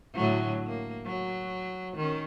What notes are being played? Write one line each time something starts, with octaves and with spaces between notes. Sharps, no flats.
A2 D3 F#3
A#3
F#3
D#3 C#4